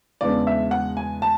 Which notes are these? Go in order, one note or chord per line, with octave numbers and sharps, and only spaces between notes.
E2 C#3 G#3 B3 D4 D5
E5
F#5
G#5
A5